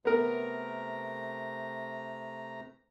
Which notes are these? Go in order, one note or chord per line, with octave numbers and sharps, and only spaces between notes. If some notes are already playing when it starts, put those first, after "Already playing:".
C3 A3 B3 A#4 A#5